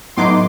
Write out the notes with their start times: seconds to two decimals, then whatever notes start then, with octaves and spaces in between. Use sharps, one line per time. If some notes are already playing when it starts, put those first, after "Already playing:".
0.17 A2 F#3 B3 D#4 C6 D6